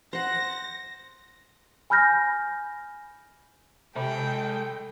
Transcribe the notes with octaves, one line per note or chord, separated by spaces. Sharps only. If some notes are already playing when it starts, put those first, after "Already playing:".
C5 F#5 A#6
G#5 B5 F6 G6 A#6
C3 G#3 A4 G5 B5